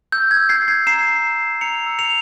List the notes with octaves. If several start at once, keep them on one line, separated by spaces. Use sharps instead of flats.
E6 G6
G#6
E6
G#6 C7
G6
G#6 C7
A#5 C7 E7
G6
E6
A#5 C#7 F7
E6
C#7 F7